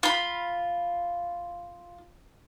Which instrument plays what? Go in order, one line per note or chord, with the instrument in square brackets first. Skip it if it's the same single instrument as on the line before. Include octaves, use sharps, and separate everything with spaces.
[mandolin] F4 B5